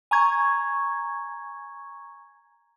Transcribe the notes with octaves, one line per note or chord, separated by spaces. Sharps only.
G#5 A#5 C#6 G#6